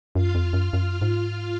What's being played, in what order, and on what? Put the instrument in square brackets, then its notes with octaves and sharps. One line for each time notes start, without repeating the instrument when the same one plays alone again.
[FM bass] F#2 [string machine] F4 F5
[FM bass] F2
F#2
F#2
G#2